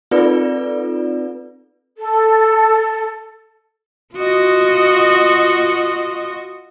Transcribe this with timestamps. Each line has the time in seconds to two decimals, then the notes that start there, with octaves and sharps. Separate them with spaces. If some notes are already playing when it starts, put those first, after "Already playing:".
0.11 C4 D#4 F4 A4 B4 D5
1.98 A4
4.15 F4 F#4 D#5